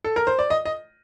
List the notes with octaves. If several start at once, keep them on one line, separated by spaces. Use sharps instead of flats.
A4
A#4
C5
D5
D#5
D#5